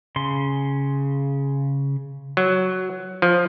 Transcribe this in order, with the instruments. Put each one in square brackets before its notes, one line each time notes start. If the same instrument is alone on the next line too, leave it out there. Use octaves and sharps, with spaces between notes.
[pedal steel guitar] C#3 C6
[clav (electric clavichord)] F#3
F3